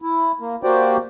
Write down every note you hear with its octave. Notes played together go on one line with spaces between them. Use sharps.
E4
A#3
A#3 F#4 G4 C5 D5 G5